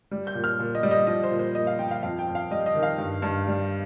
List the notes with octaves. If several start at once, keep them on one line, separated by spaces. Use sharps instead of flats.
G3
G6
A#2
F6
A#2
D#5
G3
D#5
F3 D#5
C5
A#2
C5
A#2 D#5
F5
F3 G5
F5
F2 F5
G5
F2
F5
G3 D#5
D#5
D#3
F5
G2
G2
G3